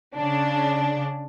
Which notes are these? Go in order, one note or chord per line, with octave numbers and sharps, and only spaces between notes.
C#3 D4